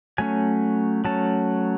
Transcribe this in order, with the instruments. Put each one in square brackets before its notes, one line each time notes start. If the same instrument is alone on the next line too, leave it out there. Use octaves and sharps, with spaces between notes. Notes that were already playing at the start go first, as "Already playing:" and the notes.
[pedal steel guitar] F#3 A3 C#4 G#5
F#3 A3 C#4 A5